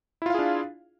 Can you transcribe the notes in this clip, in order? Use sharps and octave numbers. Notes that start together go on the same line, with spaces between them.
D4 E4 F4 G#4 F5